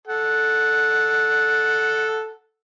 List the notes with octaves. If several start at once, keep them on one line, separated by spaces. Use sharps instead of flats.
A4 F#5